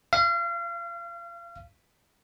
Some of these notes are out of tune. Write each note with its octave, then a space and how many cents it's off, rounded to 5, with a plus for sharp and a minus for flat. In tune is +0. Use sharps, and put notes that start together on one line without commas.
F5 -35